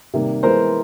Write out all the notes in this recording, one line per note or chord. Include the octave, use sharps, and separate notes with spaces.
C3 D#3 G3 A#3
E3 G#3 B3 A#4 C5